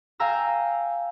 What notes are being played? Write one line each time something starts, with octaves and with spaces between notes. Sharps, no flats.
F5 G5 G#5 A#5 E6